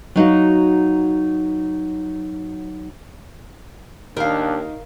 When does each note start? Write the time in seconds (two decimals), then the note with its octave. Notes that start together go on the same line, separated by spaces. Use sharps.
0.16 F#3 D#4 F#4 F5
4.17 D#2 D#3 D4 A#4 F5